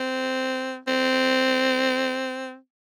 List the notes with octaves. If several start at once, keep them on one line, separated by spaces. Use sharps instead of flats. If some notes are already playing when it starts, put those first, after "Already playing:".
Already playing: C4
C4